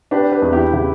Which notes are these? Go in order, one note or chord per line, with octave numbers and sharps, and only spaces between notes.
D4 G4 B4
G4 B4
E2
E4 G4
C#3 E4 G4